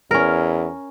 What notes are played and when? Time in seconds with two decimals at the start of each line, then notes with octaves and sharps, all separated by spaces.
0.11 E2 C#4 A#4